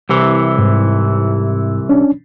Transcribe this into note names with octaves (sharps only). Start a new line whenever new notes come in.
C2 C3 E3
G#2
C#4 D4